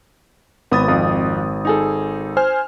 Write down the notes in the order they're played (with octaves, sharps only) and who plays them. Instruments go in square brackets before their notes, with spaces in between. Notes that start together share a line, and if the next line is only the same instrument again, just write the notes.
[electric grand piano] G#1 D#6 A6 [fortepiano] B3
[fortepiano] F2
D#4 G#4 A4
[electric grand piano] C5 G#5 F6